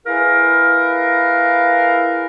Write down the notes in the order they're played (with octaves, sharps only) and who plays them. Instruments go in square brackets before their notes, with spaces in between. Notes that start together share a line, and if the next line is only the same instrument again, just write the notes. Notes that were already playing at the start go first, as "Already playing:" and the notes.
[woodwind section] E4 G#4 A#4 B4 F5